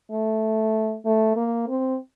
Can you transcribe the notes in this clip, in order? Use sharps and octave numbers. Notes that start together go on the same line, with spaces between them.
A3
A3
A#3
C4